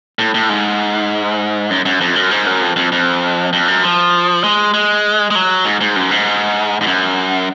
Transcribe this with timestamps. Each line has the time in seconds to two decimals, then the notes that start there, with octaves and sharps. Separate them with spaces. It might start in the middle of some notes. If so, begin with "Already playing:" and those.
0.19 A2
0.34 A2
0.49 G#2
1.70 F#2
1.85 F#2
2.01 F2
2.16 F#2
2.31 G#2
2.47 F#2
2.61 F2
2.76 F2
2.92 F2
3.53 F2
3.68 F#2
3.83 F3
4.44 G#3
4.74 G#3
5.31 G#3
5.35 F#3
5.65 G#2
5.81 G#2
5.96 F#2
6.11 G#2
6.81 G#2
6.87 F#2